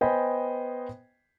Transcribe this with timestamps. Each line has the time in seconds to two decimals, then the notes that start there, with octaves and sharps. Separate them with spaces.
0.01 B3 C5 D#5 G5 G#5 B5